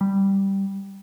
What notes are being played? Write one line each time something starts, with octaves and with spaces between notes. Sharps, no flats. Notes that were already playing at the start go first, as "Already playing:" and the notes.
G3